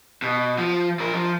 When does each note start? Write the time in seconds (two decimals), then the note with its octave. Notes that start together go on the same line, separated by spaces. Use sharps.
0.22 B2
0.58 F3
0.99 F3 A#4
1.13 F3